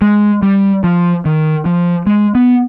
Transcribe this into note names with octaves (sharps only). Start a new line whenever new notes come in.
G#3
G3
F3
D#3
F3
G#3
B3